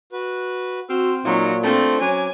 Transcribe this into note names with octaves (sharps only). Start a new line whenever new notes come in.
F#4 B4
C4 F#4 C6 E6 F6
A#2 F#3 D#4 F4
A3 C4 D4 F4 C5
F#3 C#4 G#5 D6